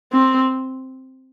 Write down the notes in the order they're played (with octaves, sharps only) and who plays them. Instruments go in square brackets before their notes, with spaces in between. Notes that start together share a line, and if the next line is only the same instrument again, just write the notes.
[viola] C4